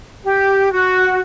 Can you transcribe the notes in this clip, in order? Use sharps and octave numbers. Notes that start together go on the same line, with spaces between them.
G4
F#4